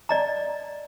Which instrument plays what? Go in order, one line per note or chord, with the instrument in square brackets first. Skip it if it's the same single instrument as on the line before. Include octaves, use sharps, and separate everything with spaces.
[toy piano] D5 D#5 A#5